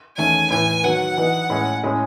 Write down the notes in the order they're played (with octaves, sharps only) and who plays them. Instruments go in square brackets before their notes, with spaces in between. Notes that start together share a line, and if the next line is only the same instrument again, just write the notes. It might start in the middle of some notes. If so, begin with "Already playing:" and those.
[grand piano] E2 D#3 A3 C#4 [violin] G#5
[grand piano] A2 E3 B3 [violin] G#5
[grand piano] D#3 F#3 B3 [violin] F#5
[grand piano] E3 B3 D#4
A2 G#3 C#4 G#4
A2 G#3 C#4 G#4